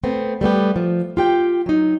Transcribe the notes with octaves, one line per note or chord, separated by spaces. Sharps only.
A3 B3 C4
G3 A3 B3 G4
F3
F4 G4 G5
F#3 D#4